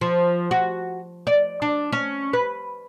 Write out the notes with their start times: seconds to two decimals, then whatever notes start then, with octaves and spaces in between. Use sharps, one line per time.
0.01 F3
0.51 F#4
1.27 D5
1.62 D4
1.92 C#4
2.33 B4